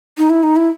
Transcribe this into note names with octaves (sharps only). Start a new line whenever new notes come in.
D#4
E4
D#4
E4